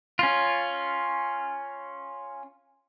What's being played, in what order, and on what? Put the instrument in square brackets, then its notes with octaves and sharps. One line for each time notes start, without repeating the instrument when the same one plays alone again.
[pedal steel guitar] C#4 F4